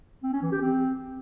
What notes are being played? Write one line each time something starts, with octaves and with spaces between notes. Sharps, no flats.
C4
C#4
E3
G4
C4